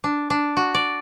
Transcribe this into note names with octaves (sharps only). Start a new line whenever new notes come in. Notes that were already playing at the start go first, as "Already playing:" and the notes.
D4
D4
F#4
D5